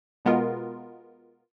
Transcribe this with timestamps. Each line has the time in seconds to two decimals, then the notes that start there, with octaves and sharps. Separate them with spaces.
0.25 B2 G#3 B3 F4 A#4